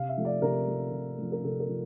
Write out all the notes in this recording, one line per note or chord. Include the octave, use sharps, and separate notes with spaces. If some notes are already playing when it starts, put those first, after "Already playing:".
Already playing: C3 F5
E5
F3 A3
D5
C3 A#4
F3 A3
C3
F3 A3
A#4
C3 A4
A#4
F3